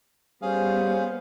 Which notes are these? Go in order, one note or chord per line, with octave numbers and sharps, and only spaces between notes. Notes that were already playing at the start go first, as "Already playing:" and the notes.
G3 B3 C#4 G#4 C5 F5